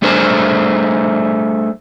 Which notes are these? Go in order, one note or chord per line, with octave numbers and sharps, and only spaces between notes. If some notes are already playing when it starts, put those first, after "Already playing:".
G3 A3 D4 G#4 A#4 C5